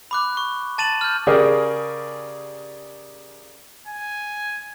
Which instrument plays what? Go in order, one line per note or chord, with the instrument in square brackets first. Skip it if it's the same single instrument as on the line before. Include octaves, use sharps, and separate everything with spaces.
[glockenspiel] B5 D6 F#6
C#6
A5 A6 D#7 E7 F#7
F6 G6
[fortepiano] C#3 G4 G#4 A#4 D5
[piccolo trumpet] G#5